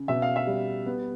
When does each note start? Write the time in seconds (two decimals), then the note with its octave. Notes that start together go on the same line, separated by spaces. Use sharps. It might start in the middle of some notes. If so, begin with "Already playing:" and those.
Already playing: C#3
0.08 B2 E5
0.22 F5
0.36 E5
0.47 G3
0.86 B3